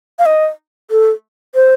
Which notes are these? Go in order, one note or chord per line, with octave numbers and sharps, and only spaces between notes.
F5
D#5
A4
C5